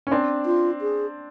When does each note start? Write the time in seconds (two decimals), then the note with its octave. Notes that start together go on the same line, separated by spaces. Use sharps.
0.07 C#4
0.11 C4 D4
0.46 F4
0.81 G#4